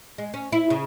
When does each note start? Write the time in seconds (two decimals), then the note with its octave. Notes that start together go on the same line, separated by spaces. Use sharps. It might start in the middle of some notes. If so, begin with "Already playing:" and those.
0.18 G#3
0.34 C#4
0.52 E4
0.70 C#3